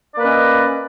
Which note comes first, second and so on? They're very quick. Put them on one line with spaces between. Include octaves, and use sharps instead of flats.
D5 A#3 B4 C#4 D#5